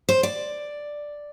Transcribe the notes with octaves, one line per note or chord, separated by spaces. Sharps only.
C5
D5